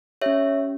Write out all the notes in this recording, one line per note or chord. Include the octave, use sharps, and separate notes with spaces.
C#4 G4 C#5 E5